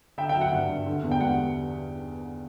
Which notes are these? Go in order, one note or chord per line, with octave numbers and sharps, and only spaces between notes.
D3 E5 G5
E5 G5
F#3
F#5
G2 F#5
G2
D3
E2
G5
G3 F#5